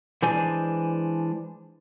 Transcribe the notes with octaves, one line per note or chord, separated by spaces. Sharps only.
E3 G#3 D4 C5 D5 G#5